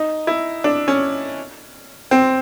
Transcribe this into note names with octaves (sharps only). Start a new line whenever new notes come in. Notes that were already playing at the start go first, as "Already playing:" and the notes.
Already playing: D#4
E4
D4
C#4
C4